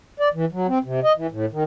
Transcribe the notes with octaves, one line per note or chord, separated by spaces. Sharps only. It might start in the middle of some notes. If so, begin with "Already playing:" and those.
D5
E3
F#3
C4
C3
D#5
E3
A2
D#3